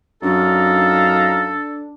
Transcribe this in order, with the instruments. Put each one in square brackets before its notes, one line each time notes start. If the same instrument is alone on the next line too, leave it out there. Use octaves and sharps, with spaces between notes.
[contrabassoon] F#2 [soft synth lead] D4 [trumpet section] D#4 F5 A#5 [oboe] A4